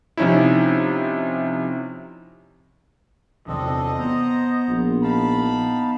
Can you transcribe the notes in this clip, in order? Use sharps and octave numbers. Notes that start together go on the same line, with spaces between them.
C3 F3 C#4 D#4 E4
E2 C3 E3 C4 D4 A4 D#5
B3 C5 A#5
A#1
D#4 F5 A5 B5